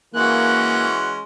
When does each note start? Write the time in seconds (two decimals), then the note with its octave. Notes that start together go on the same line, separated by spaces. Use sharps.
0.15 E3 G#3 A#3 C#4 F#4 F#6